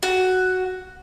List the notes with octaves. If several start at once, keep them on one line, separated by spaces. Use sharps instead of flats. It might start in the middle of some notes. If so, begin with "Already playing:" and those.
F#4